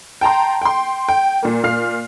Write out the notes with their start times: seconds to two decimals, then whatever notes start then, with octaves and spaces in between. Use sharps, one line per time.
0.21 G5 A5 A#5 C6
0.62 G5 C6
1.09 G5
1.43 A#2 A#3
1.64 A#2 F5 F6 C7